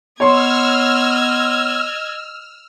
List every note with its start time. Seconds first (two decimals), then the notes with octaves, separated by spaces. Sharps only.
0.20 B3 C#5 D#5 C6 E6 F6 G#6